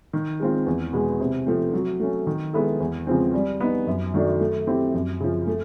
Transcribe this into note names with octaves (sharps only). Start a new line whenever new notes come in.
D#3
G#3 C4 F4
E2
B2 G#3 B3
C3
F3 A3 C4
F#3
A3 C#4
D#3
G#3 B3 E4 A4
E2
C#3 F3 G#3 C4
G3
B3 D#4
F#2
D#3 F#3 A3 D4
A3
C4 E4 G4
F#2
C#3 F3
A3